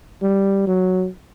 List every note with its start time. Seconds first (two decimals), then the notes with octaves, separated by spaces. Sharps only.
0.22 G3
0.67 F#3